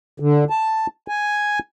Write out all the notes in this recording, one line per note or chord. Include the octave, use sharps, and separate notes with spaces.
D3
A5
G#5